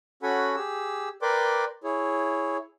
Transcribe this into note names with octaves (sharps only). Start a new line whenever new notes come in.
C#4 F#4 A4 F#5 G#5 B5
G4 G#4 E6
A#4 B4 D5 G5 C6 D6
E4 G#4 C#5